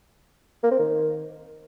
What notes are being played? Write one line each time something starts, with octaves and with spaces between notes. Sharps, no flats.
A#3
C4
D#3